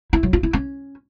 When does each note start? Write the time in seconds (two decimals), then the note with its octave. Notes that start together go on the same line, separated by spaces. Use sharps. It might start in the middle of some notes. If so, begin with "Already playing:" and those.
0.13 E4
0.23 F#3
0.33 F4
0.43 E4
0.53 C#4